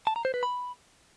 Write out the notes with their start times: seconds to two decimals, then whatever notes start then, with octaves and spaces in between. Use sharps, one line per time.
0.07 A5
0.16 A#5
0.25 C5
0.34 B4
0.43 B5